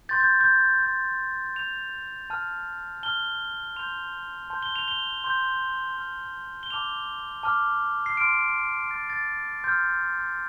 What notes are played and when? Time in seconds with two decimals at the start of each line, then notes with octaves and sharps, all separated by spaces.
0.09 C6 G6 A6
0.20 G6
0.41 G6
0.82 C6 G6
1.56 C6 G6 F7
2.30 A5 F6
3.03 A5 F6 G7
3.76 C6 G6 F7
4.50 A5 C6 G6
4.63 G7
4.76 F7
4.88 G7
5.24 C6 G6
5.97 C6 F6
6.63 G7
6.70 A5 D6 F6 F7
7.43 A5 D6 F6
8.06 C7
8.17 C6 F6 D7
8.91 C6 F6 A6
9.00 C7
9.10 A6
9.64 C6 F6 G6